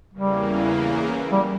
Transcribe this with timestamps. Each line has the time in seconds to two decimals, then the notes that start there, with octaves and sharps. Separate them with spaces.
0.13 E2 C#3 E3 G3 A#3
1.32 G3